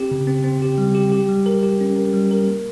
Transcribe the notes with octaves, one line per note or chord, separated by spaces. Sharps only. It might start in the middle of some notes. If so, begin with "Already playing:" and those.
Already playing: C4 G4
C#3
C4
C4
G4
G3
G4
G4
G3
A#4
G4
C#4
A#4
G3
A#4
A#3